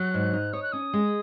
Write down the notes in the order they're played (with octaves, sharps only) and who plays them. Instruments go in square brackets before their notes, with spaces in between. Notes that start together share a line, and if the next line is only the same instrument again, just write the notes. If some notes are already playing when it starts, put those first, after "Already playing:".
Already playing: [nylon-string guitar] F#3 [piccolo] F#6
[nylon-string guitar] G#2
D#4
[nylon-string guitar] C#5 [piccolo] D#6
[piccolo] F#6
[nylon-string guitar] C#4 [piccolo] D#6
[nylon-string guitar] G#3